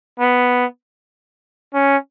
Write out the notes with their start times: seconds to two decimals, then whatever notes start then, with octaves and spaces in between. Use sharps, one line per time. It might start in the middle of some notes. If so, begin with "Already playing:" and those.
0.20 B3
1.74 C#4